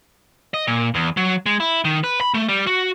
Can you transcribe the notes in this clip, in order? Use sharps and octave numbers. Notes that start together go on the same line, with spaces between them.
D#5
A#2
E2
F#3
G#3
E4
D#3
B4
B5
A3
G3
F#4